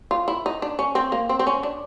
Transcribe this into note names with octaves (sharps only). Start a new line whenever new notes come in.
F4
E4
D#4
D4
C#4
C4
A#3
C4
C4
C#4
D4